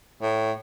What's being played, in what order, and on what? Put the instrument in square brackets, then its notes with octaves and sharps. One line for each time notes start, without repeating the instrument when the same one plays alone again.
[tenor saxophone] A2